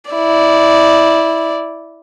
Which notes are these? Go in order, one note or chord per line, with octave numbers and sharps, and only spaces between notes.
E4 D5